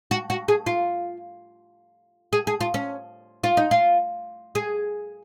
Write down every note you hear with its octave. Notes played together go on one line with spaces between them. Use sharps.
F#4
F#4
G#4
F4
G#4
G#4
F4
C#4
F4
D#4
F4
G#4